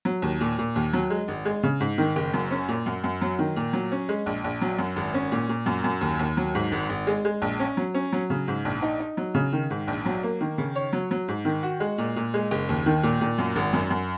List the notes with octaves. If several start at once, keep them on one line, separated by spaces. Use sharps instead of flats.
F#3
D#2
A#2
A#2
D#2
F#3
G#3
G#1
G#3
C#3
G#2
D#3
F#1
F#2
C#4
A#2
F#2
F#2
F#3
D#3
A#2
F#3
C#4
G#3
A#1
A#1
F#3
F#2
G#1
C#4
A#2
A#2
F#2
F#2
D#2
D#2
F#3
G#2
G#1
G#1
G#3
G#3
A#1
C#4
F#3
C#4
F#3
C#3
G#2
A#1
D#4
D#4
F#3
C#3
D#3
G#2
A#1
F#3
A#3
D#3
C#3
C#5
F#3
F#3
G#2
D#3
F#4
G#3
A#2
A#2
G#3
F#1
D#2
D#3
A#2
A#2
F#2
G#1
F#2
F#2